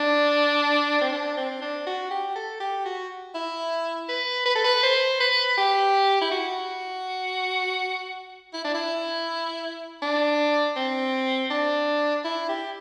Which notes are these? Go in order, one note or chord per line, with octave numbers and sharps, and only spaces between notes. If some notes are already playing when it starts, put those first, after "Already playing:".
Already playing: D4
C4
D4
C4
D4
F#4
G4
A4
G4
F#4
E4
B4
B4
A4
B4
C5
B4
G4
E4
F#4
E4
D4
E4
D4
C4
D4
E4
G4